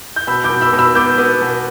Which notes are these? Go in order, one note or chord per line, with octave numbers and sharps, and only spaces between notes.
G6
B2 B5 E6
D6 G6
B2
B5 E6
B2
B5 E6
B3 D6 G6
B3
B2